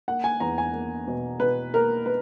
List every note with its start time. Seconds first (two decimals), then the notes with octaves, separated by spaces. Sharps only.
0.08 A#3 F#5
0.24 G#5
0.40 E2 A#5
0.58 G#5
0.73 A#3
1.07 B2
1.40 B2 B4
1.74 A#3 A#4
2.06 B4